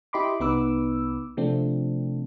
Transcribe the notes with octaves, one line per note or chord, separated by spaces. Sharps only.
E4 G4 D#5 B5 C6 D6
C2 B3 D#4 B4 D6 E6
C3 F3 A3 C4 D4